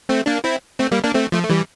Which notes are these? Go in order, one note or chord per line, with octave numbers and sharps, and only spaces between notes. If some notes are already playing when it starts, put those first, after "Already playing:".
A3 C4
A#3 D4
C4 E4
A3 C4
G3 A#3
A#3 D4
A3 C4
F3 A3
A3
E3 G3